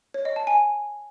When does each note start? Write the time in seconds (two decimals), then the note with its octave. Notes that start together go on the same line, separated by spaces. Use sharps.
0.14 C#5
0.25 D#5
0.36 A5
0.47 G#5